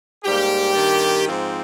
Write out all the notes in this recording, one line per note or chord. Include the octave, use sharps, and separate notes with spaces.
G#2 G3 A#3 G4
G2 D#3 A#3
G#2 F3 C4